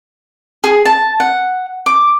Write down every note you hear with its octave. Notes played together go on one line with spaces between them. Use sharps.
G#4
A5
F#5
D6